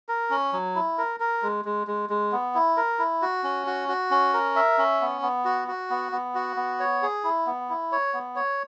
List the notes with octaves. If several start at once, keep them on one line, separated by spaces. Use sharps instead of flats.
A#4
C#4
F#3
E4
A#4
A#4
G#3
G#3
G#3
G#3
B3
E4
A#4
E4
F#4
C#4
F#4
F#4
C#4
A#4
E5
C#4
B3
B3
F#4
F#4
B3
B3
F#4
B3
C#5
G#4
E4
B3
E4
C#5
B3
C#5